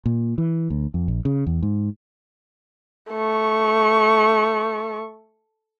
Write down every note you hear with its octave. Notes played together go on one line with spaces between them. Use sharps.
A#2
E3
D2
F2
A#1
C#3
E2
G#2
A3 C#6